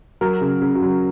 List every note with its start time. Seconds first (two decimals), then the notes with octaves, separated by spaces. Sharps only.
0.21 F#3 A#4
0.41 C#3
0.62 C#3
0.75 F#4
0.82 F#3